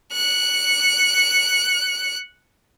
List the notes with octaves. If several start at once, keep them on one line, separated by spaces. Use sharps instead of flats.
F#6 C#7